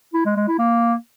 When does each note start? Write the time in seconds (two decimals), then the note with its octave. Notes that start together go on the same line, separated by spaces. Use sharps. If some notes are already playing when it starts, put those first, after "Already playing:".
0.14 E4
0.25 G#3
0.36 G#3
0.48 E4
0.59 A#3